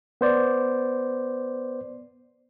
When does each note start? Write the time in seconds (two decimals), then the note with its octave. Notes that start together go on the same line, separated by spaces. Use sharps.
0.21 B3 C5 D5